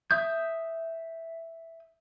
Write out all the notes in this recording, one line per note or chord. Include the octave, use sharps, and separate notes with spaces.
E5 D#6 G6